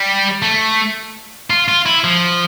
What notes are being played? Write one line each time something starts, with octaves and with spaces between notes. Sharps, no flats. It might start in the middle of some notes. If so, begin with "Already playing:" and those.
Already playing: G3
A3
F4
F4
E4
F3